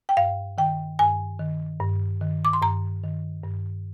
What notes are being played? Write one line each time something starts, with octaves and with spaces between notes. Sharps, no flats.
G5
G2 F5
D#3 G5
G2 G#5
D#3
G2
D#3
D6
C6
G2 A#5
D#3
G2